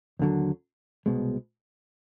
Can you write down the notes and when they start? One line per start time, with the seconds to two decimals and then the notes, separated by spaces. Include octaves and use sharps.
0.19 D#2 D3 F#3
1.06 C2 B2 G#3